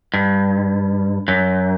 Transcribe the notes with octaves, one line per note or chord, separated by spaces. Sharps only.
G2
F#2